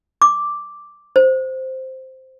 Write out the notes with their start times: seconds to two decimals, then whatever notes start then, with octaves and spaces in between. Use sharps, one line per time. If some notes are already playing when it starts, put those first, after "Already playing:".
0.22 D6
1.16 C5